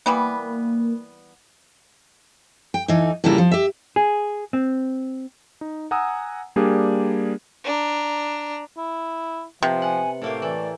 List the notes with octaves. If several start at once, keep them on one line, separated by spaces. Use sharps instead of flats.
E3 G3 A#3 B3
G5
D2 E3 D#4
A2 C#3 G3 A#3 E4 F4
F3
G4 E5
G#4
C4
D#4
F#5 G#5 A#5 D#6 E6
G3 A#3 D4 G4 G#4
D4 A#5
E4
C3 F3 B3
F#5 G#5
A2 A3 A#3 G4 F5
E3 D5